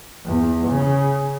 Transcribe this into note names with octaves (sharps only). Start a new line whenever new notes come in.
E2
C#3